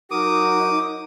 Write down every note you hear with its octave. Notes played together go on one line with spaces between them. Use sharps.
F#3 D#4 F#4 A#4 D6 D#6